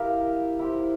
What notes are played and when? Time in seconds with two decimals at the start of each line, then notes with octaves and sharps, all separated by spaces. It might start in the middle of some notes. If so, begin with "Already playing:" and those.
Already playing: E4 G4 A#4 F5
0.59 E4 G4 C5